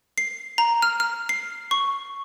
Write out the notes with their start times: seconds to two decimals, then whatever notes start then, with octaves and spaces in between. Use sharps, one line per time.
0.18 C7
0.58 A#5
0.82 F6
1.00 F6
1.29 C7
1.71 C#6